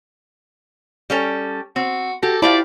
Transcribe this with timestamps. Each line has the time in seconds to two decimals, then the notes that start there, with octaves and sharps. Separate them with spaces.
1.10 G3 C#4 A4
1.76 C4 F#4
2.23 F#4 G4 A4 A#6
2.42 E4 F4 G4 C5 D5 A5 B5